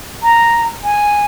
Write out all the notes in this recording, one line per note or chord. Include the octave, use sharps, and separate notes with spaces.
A#5
G#5